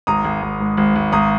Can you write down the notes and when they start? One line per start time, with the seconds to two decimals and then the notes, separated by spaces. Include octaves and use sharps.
0.07 G#1 A#5 D#6
0.25 G#1
0.42 G#1
0.60 G#2
0.77 G#1
0.96 G#1
1.12 G#1 A#5 D#6